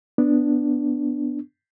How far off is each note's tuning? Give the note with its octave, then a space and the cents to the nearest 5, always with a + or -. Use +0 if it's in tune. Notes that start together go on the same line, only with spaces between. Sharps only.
B3 +0 D4 +0